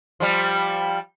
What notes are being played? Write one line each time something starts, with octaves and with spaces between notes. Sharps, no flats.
F3 G3